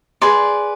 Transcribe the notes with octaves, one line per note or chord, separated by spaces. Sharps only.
G#4 B4 D5 C6